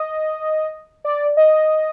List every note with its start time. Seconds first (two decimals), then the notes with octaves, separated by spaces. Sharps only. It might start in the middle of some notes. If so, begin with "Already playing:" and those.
Already playing: D#5
1.05 D5
1.37 D#5